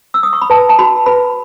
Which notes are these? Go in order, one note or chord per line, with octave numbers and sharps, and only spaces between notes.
E6
D#6
C#6
B5
B4 A5
A5
F#4 B5
B4 B5